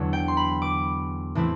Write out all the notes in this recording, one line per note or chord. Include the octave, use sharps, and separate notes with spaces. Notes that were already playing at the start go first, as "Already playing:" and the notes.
Already playing: E2 D3 F#3
G5
C6
B5
D6
A2 E3 A3 C4 E4